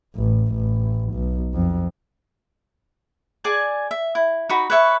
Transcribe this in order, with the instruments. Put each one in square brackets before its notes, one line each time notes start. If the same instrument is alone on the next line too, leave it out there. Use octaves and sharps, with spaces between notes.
[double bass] A1
A1
B1
F2
[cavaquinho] G#4 D5 G#5 A5
E5
E4
D#4 F#4 B5
B4 C#5 E5 C#6